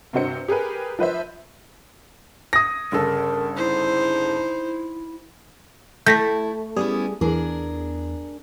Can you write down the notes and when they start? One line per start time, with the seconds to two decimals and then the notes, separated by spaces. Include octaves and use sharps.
0.13 G2 C3 F#4 C5 C#7
0.48 G4 G#4 A#4 B4
0.99 F3 B4 C5 E5
2.53 D#6 A#6
2.92 G1 C#3 A4 A#4
3.57 D#4 E4 C5
6.06 A3 E4 G5 A5 G6 A#6 B6
6.76 G3 B3 C#4 E4 G4 G#4
7.21 E2 D4 G#4 A#4